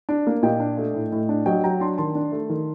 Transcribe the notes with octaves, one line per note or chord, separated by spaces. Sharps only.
D4
A#3
A#2 D#5 G5
D4
A3
A2
A2
D4
F#3 D#5 G5
F#3 G5 A#5
D4 A5 C6
D#3 A5 C6
D4
A3
D#3